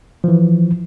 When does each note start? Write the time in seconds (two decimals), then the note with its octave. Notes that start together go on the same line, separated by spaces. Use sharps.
0.24 E3 F3